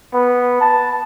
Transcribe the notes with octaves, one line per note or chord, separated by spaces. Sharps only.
B3
A5